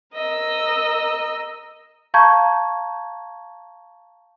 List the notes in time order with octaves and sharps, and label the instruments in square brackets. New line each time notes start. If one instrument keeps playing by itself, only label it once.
[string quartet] A#4 D#5 E6
[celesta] F5 A5 A#5 C#6 G6 G#6